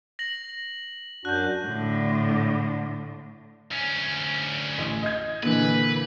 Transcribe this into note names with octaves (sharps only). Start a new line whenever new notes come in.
A#6 F#7
F#2 D4 F#4 F#6 G6
A2 D3
D2 C#4
A1
D#5 G#6
A#2 D3 E3 B4